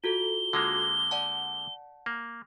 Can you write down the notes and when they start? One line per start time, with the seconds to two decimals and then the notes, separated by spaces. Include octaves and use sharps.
0.04 F4 F#4 A4 G7
0.53 D3 G#3 A#3
1.11 D5 F#5 A5
2.06 A#3